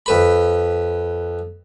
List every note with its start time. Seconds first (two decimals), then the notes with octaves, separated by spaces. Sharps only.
0.06 F2 B4 B5